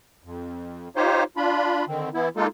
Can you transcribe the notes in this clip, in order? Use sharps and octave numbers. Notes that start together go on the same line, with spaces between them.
F2
D#4 F4 G4 C5 C#5
D4 F4 B5
D3 D#3 C4
E3 B3 E4
G#3 A#3 D#4 F4 A4